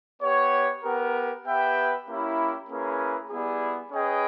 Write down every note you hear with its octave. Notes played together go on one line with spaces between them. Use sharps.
B3 G4 C#5
B3 G4 A#4
B3 G4 B4 E5 G5
A#3 C#4 E4 G4
A#3 C#4 E4 G#4 B4
G3 B3 E4 G#4
C#4 G#4 B4 D#5 G5